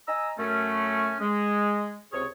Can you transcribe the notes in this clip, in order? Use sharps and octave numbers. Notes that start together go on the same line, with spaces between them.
D#5 G#5 A#5 E6
F#2 A3 C#4
G#3
C#2 C3 G#4 C#5